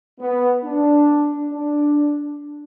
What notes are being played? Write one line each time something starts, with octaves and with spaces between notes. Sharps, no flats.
B3
D4
D4